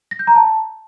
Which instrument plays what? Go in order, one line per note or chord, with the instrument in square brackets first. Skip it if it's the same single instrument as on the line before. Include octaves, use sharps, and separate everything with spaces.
[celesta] A#6
G6
A#5
A5